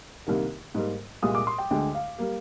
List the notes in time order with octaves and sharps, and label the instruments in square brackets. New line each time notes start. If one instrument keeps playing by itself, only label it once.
[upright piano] C2 C3 D#3 A#3
G#2 G3 A#3
C2 A#2 G#3 D#6
D6
C6
G5
D2 D3 G#3 G5
F5
G3 A#3